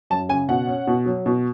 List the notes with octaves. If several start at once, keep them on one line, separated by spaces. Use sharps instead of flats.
F#2 A5
C#3 G#5
B2 F#5
C#4
B2
F#3
B2